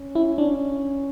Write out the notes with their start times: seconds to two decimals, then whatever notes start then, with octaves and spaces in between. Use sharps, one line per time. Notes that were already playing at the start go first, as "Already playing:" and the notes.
Already playing: C#4
0.15 E4
0.38 D4